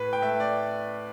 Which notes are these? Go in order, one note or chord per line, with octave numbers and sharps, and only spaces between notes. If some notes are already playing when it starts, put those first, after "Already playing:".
Already playing: A2 B4
G5
A3 E5
D5